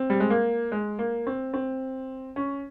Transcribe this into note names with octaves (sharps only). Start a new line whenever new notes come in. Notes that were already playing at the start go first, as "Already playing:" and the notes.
Already playing: C4
G3
G#3
A#3
G#3
A#3
C4
C4
C#4